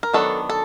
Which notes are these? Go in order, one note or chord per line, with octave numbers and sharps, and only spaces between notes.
A#4
D#3 F#3 B3 D4 A4
A4